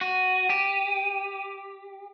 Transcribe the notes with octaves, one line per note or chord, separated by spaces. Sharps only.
F#4 D#7
G4